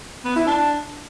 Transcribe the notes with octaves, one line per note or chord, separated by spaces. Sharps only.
B3
E4
D4